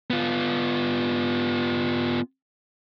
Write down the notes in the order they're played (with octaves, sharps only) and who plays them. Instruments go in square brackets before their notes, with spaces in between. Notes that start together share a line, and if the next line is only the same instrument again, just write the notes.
[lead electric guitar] B3 F4